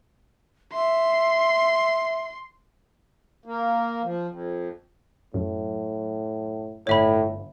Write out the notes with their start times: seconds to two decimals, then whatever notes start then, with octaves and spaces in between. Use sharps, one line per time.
0.73 E5 C6
3.46 A#3
4.03 F3
4.28 F2
5.34 F#2 A2
6.87 G1 A2 C#5 E5 B5